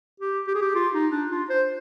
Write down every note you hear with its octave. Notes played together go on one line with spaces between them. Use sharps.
G4
G4
G#4
G4
F4
D#4
D4
F4
C5